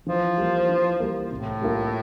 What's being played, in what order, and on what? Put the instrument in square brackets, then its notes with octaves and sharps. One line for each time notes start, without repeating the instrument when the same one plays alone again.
[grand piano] E3 [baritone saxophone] F3
[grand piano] G3 A#3
E3
G3 A#3
[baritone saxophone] A2 [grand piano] C3
[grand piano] G3 A#3 F4